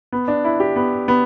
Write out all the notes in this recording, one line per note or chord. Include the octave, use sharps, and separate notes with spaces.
B3
D4
E4
G4
B3
B3